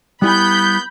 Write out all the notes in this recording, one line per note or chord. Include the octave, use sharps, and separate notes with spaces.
G3 B3 E4 G#5 B5 G6